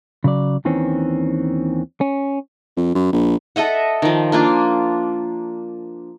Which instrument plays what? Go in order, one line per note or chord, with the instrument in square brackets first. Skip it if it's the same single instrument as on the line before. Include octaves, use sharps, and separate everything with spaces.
[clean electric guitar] C#3 F#3 D5
D#2 D#3 E3 C4 C#4
C#4
[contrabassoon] F2
F#2
A#1
[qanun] A4 D#5 E5 F#5
D#3 F3
A#3 D4 F4